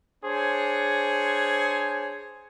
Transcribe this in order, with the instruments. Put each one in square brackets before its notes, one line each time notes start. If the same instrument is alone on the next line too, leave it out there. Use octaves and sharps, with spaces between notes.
[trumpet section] D4 G#4 C5 C#5